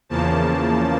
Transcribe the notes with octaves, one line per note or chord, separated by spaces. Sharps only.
E2 C#3 F3 A#3 A5